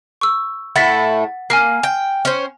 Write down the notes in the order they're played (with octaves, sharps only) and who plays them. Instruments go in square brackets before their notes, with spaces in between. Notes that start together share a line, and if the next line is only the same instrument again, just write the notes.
[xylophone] C#6 E6
[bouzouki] A2 A3 E4 [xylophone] F#5 A6 B6
[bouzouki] A#3 [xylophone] G#5 F6 C7
[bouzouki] G5
C#4 C5